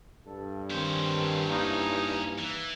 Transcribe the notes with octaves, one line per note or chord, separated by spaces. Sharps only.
G2 A4
D#3 C4 C#4 C5
A#3 D#4 E4
E3